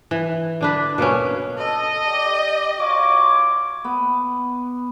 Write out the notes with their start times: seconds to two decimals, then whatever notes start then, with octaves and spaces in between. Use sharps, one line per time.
0.11 E3
0.61 D3 D4 B4
0.98 B2 A#3 B3 C#4
1.57 A4 D#5
2.06 G4 D5
2.79 F4 F#4 C#5 D6
3.84 B3